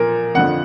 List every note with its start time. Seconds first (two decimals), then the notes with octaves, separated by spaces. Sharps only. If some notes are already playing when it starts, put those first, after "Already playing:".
Already playing: A#2 F3 A#4
0.35 F2 D3 F3 F#5